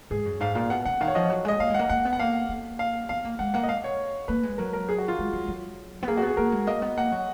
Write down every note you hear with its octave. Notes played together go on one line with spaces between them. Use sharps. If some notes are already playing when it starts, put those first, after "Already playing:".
G#2 G#4
F#2
G#2 F5
A#2 F5
B2 F#5
C#3 F#5
D#3 F5
C#5
F3 D#5
F#3
G#3 D#5
A#3 F5
G#3
F#5
A#3
A#3 F#5
B3
F#5
A#3 F5
A#3
F5
B3 F5
A#3
G#3 F#5
A#3 F#5
D#5
F5
C#5
A#3 B4
G#3
F#3 A#4
A#4
G#4
F#4
F4
G#3
F#3
F#3
B3
A#3 G#4
F#4
B3 G#4
A#3 A#4
G#3
A#3 D#5
B3
A#3 F#5
F#3